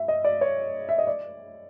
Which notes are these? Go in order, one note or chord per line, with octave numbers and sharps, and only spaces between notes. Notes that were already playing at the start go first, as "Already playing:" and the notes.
Already playing: E5
D#5
D5
C#5
E5
D#5
D5